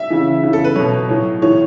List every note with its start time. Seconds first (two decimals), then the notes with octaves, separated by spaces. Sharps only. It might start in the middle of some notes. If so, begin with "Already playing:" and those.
Already playing: E5
0.10 C#3 E3
0.43 C#3 E3
0.53 A4
0.64 B4
0.75 B2 F#3 C#5
1.09 A2 F#3
1.42 A2 E3 C#5